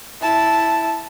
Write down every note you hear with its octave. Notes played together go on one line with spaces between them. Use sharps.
E4 A5